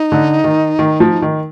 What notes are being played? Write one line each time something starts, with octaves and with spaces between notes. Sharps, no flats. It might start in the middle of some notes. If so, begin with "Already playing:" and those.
Already playing: D#4
D3
D#3
D#3
F3
D#3